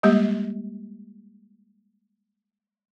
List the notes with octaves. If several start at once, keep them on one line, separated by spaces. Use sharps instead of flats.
G3 G#3 A#3 G4